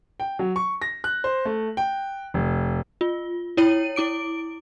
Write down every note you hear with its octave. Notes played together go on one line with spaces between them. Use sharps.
G5
F#3
C#6
A#6
F#6
C5
A3
G5
F1
F4
E4 C#5 G5 D#7
E4 D6 D7